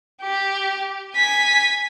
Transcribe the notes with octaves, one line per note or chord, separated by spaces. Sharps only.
G4
G#5 B6